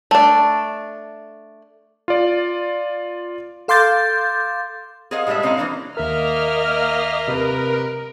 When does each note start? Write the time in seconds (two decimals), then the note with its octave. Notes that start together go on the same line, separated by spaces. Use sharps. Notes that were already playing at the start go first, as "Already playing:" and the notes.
0.11 A3 D4
2.08 F4 D5
3.68 A4 F5 C6 D6 G6 A6
5.11 G#4 A#4 C5 D#5 F5 F#5
5.27 A2 G3 G#3 D#5 E5
5.43 A2 C4 C#4 D#5 F5 A#5
5.57 D#3 E3 G#3 A#3 D4
5.97 D#2 A#3 A#4 D#5 E5 F6
7.28 C3 A#4 B4